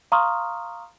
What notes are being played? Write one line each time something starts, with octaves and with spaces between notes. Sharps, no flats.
F5 A#5 C6 C#6 D#6 F6